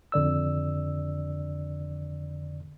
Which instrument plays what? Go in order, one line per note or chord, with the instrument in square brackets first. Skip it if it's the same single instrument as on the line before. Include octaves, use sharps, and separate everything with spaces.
[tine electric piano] F2 D3 D5 E6